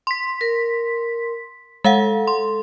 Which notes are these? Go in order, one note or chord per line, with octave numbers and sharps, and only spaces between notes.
C6 B6
A#4
G#3 A4 F5 F#5
C6